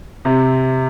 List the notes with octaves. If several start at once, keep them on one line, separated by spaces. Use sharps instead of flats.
C3